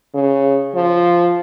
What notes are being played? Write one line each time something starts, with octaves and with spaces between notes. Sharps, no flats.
C#3
F3